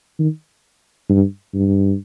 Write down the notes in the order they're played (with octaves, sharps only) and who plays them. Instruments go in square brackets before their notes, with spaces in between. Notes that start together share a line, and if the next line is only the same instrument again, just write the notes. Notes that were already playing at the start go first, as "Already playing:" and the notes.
[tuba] D#3
G2
G2